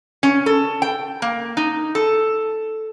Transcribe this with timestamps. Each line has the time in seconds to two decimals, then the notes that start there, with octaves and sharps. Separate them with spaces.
0.23 C#4
0.46 A4
0.82 G5
1.22 A#3
1.57 D#4
1.95 A4